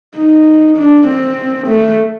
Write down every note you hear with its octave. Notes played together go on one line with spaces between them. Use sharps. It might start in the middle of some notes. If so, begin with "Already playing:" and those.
D#4
D4
C4
A3